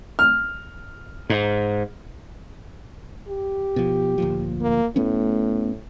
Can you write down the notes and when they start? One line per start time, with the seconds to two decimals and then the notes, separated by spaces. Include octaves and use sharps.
0.19 F6
1.30 G#2
3.28 G4
3.76 B2 F3
4.18 D2 A#2 F3
4.61 A#3
4.96 A2 A3 B3 C#4